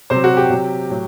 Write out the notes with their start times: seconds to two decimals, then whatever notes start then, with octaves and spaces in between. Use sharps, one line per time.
0.10 C3 F#3 C5
0.24 F#4
0.37 G4
0.50 C3 F#3
0.90 A2 F#3